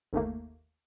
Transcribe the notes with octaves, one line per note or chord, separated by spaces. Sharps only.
G1 D#2 A3 A#3